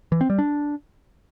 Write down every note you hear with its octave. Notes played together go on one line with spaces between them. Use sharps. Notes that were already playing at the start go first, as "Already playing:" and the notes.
E3
C4
G3
D4